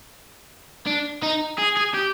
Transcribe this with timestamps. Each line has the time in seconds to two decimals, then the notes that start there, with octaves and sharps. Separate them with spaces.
0.86 D4
1.22 D#4
1.58 G#4
1.77 G#4
1.94 G4